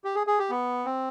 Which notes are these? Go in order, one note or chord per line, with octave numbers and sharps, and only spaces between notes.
G4
G#4
G#4
G4
B3
C4